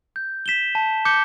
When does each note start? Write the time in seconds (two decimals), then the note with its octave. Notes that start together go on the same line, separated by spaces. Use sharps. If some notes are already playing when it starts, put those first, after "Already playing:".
0.16 G6
0.46 B6 E7 G7
0.75 A5
1.05 D6 G6 C#7 G7